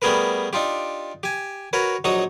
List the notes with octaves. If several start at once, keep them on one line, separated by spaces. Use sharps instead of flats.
G3 A3 B3 G#4 A#4 B4
D4 D#4 F4 G4
G4 G#5
F#4 A#4 B4 C#5
A#1 F#3 D#4 F#4 C#6 D#6